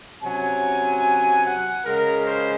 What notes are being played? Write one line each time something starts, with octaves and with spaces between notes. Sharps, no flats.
C3 F#3 C#4 G#5
F#5
C#3 G#3 C#4 A#4
C5